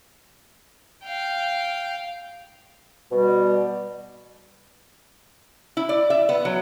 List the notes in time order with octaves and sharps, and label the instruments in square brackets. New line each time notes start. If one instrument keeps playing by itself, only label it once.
[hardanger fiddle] F5 G5
[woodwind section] B2 G3
[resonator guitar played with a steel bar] E4
D5
E5
B3
F#3